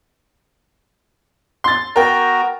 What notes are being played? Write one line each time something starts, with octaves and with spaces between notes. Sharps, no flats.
C6 A6
B3 F#4 A#4 G5 A#5